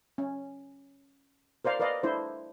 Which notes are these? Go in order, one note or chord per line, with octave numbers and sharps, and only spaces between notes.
C#4
A#4 C5 D5 F5
A#4 B4 D5 D#5 F5
D4 E4 C5